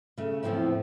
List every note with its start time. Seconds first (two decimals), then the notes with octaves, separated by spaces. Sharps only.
0.17 C#3 A3
0.43 E2 A2 F3 C4 E4